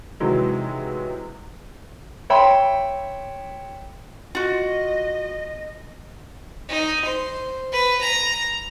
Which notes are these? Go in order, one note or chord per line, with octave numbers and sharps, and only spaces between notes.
C3 D#3 E3 F#3 G#3
C#5 E5 G5 B5 C6
F4 F#4 D#5
D#4
C5
B4
A#5